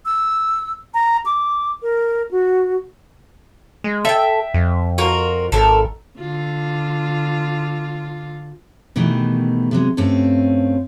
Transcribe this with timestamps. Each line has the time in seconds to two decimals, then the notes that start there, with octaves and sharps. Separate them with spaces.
0.05 E6
0.94 A#5
1.26 D6
1.82 A#4
2.31 F#4
3.84 G#3
4.05 A4 E5 G5
4.54 F2
4.98 F4 F#4 A#4
5.52 G#1 A4 A#4
6.19 D3 F4
8.96 B2 D#3 E3 A3 G4
9.71 C3 F#3 G#3
9.97 G2 A3 C4 C#4 F4